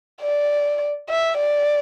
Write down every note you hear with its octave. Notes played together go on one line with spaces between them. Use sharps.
D5
E5
D5